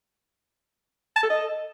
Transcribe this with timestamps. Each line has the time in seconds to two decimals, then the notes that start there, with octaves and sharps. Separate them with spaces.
1.16 A5
1.23 A4
1.30 D#5